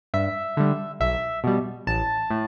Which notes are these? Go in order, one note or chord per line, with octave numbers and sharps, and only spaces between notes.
G2 E5
D3 G3
B1 E5
B2 G3
A1 A5
A2